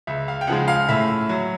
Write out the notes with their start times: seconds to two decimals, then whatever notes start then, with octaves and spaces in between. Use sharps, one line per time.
0.07 C#2 E5
0.28 F5
0.41 G5
0.47 C#3 F3 G#3 F#5
0.68 F5
0.89 A2 E5
1.29 F#3